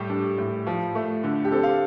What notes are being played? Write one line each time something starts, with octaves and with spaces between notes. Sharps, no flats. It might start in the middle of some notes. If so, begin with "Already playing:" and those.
Already playing: A2 G3 G4
D4
A2
F3
A3
D3
G4
C4 A4
F5